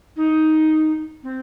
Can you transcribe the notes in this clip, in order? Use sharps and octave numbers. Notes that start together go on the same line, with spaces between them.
D#4
C4